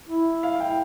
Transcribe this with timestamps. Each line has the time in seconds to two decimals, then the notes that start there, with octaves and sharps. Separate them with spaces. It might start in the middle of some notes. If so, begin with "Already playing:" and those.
0.09 E4
0.43 F5
0.60 G5